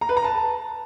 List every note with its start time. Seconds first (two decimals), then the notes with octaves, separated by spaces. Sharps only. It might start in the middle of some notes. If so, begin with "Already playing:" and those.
0.01 A#5
0.09 B4
0.17 A#5
0.24 A5